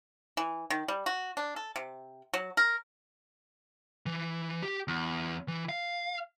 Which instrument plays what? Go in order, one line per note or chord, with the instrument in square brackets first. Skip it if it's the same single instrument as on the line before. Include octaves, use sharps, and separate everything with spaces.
[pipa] E3
D#3
G3
F#4
D4
A4
C3
F#3
A#4
[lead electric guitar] E3
G4
E2
E3
F5